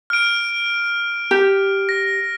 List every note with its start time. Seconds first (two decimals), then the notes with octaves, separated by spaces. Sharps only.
0.10 F6 D7
1.31 G4
1.89 A#6